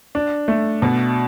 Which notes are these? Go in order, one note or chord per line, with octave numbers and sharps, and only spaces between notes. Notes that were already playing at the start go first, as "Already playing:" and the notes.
D4
A3
B2